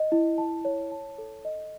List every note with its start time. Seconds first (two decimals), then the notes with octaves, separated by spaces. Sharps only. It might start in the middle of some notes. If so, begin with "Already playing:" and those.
Already playing: D#5
0.12 E4
0.38 A5
0.65 C#5
0.92 A5
1.18 A4
1.45 D#5